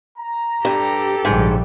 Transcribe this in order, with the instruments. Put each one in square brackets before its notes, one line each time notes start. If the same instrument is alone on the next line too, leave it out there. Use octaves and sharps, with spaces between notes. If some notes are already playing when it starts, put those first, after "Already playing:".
[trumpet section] A#5
[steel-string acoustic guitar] G2 [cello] G4 A4
[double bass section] A#1 C#3 G3 [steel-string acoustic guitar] G#2